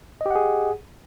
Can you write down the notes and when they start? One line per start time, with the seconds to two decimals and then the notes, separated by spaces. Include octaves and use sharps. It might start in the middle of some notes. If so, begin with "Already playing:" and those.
0.21 D#5
0.26 G4
0.31 F#5
0.35 G#4